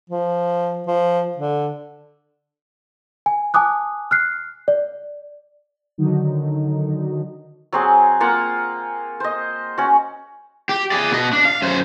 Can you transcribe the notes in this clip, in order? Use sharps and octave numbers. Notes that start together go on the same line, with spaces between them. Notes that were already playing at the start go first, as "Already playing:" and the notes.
F3
F3
D3
G#5
G#5 A5 D6 D#6 F#6
F6 F#6 C7
D5
D3 D#3 F#3 D#4
F#3 C4 G#4
A#3 F4 F#5
C5 D#5
C#4 F#4
G4
G#4 D5
B2 D#5
D4
F5
F#2 C5